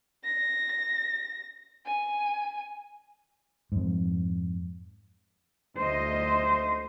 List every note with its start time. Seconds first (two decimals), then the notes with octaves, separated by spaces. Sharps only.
0.24 A#6
1.86 G#5
3.72 F2 G#2
5.77 D2 C5 D#5